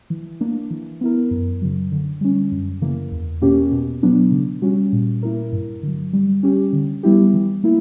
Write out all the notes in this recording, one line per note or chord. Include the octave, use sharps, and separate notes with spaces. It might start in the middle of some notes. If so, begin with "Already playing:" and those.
E3
A#3 D4
E3
B3 E4 A#4
F#2
C#3 F#3
D3
G3 C#4
F#2
C#3 E3 A#3
E2
B2 A#3 C#4 G4
B2
F#3 B3 D4
C#3
G3 C#4 F#4
A#2
A#3 E4 A#4
G2
D3 F#3
G3
C#4 G4
D3
G3 B3 E4 G4
E3
A#3 E4